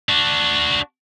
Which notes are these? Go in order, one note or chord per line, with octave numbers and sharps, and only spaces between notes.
D4 F#4